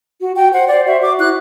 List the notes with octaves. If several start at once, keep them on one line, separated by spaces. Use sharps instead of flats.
F#4
F#4 G5
C5 F#5
C5 D5
F#4 E5
F#4 D6
E4 F#6